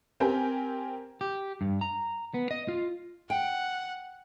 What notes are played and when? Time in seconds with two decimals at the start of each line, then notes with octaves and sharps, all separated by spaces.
0.20 C4 G4 A#4 G5 G#5
1.21 G4
1.61 G2
1.81 A#5
2.34 B3
2.51 D#5
2.68 F4
3.30 F#5 G5